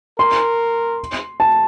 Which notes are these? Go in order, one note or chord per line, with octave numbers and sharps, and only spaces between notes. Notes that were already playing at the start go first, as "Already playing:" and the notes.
A#4 C6
A5